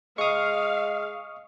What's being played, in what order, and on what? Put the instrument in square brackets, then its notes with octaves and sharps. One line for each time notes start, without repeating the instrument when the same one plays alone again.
[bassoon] G#3 [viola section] F5 [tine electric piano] C#6 D#6